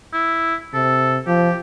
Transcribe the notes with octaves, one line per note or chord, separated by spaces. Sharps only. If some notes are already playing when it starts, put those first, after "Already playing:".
E4
C3 A4
F3 G4